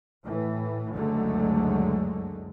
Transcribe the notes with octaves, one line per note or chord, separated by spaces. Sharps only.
A2 E3
F#1 C#2 D3 F#3 G#3 A3